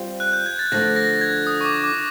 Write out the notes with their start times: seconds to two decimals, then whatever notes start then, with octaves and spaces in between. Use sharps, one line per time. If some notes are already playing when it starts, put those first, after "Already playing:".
Already playing: G3 C4 F4
0.20 F#6
0.33 G6
0.46 G#6
0.59 A6
0.72 D3 F3 A3 D4 A#6
0.86 A6
0.96 A#6
1.21 G#6
1.47 D#6
1.61 C#6
1.65 D6
1.84 D6